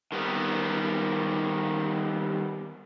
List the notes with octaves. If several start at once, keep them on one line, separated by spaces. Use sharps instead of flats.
D#3 G3 B3 C4